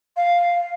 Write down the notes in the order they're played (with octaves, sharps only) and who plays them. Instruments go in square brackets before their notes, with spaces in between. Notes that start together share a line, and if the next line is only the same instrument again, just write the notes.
[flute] F5